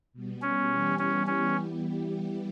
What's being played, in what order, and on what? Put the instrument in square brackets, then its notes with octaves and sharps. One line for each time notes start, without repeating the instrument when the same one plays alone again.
[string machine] B2 G3 B3
[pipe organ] C#4
[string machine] E3 G3 B3 E4 G4
[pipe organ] C#4
C#4